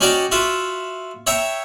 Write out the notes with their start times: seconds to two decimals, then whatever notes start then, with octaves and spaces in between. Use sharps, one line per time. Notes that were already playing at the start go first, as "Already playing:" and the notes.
0.01 C#4 D#4 F#4 D5 G5 A#5
0.32 F4 F#4 E5
1.27 C#5 E5 G5 A#5